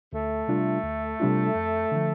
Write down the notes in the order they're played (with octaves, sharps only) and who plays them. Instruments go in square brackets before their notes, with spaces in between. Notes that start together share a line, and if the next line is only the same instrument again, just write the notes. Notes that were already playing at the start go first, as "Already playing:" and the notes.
[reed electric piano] D2 [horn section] A3
[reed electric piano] C3 G3 D4 F4
D2
C3 G3 D4 F4
F2
D3 F3